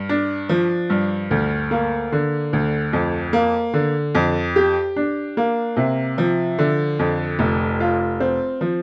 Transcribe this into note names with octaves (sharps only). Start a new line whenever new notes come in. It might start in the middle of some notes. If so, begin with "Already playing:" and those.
Already playing: G2
D4
F3
G2
D2
A#3
D3
D2
F2
A#3
D3
F2
G4
D4
A#3
C3
F3
D3
F2
F1
F4
C4
F3